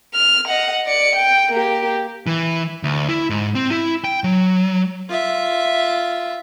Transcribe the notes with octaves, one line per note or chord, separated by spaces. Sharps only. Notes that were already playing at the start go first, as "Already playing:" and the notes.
F6
D#5 F#5
D5 C#7
G5
A#3 G4
E3
D2
E4
G#2
C4
E4
G5
F#3
F4 E5